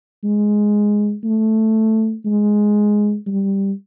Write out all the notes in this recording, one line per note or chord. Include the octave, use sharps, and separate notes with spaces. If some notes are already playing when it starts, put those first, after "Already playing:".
G#3
A3
G#3
G3